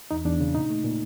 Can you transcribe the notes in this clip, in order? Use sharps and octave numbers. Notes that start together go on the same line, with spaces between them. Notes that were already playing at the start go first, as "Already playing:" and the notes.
E2 D#4
E2 D4
C#3
A#2 D#4
A3
A#2